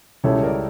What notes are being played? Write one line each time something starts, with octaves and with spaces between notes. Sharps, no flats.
C#2 C#3 G3 C#4 E4 A4 C#5
A#4 D5